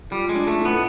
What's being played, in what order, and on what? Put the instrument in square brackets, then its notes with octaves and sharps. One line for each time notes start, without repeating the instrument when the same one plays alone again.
[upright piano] F3 [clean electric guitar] G3
[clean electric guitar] G#3
[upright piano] D4
[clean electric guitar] A3
[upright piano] A2
[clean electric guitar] B3